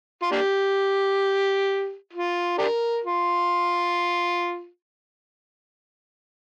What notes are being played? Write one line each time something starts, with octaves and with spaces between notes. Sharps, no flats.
F4
A#3 D4 G4
F4
D4 G4 A#4
F4